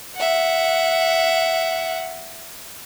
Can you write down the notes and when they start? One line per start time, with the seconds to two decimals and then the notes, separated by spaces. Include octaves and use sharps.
0.16 E5 F#5